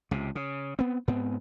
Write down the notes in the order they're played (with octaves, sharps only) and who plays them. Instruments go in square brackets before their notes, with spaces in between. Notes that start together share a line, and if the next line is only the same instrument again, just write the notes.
[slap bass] C#2 C3
C#3
B3 C4
G#2 B3 C4